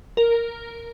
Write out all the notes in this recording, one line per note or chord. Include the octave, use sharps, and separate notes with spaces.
A#4